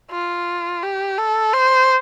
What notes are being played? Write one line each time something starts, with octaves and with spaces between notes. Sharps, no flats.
F4
G4
A4
C5